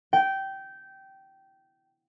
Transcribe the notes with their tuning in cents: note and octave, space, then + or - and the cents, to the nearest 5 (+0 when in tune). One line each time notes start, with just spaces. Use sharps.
G5 -15